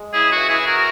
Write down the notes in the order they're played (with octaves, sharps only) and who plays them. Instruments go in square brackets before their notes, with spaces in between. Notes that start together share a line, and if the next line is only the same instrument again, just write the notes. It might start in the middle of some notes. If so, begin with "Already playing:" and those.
Already playing: [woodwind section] G#3
C#3 E4 G#4
E3 F#4
E4 G#4
E3
F#4 A#4